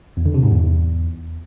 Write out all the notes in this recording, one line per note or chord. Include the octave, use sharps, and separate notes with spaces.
E2
D3
C3
G#2
E2